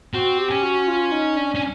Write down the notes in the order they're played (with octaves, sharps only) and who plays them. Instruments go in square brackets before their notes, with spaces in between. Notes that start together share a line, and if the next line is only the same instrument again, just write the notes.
[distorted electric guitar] C4 [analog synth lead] F#4
[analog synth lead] G4
[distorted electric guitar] C#4
[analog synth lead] F#4
F4
D#4
D4
[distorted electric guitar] C#4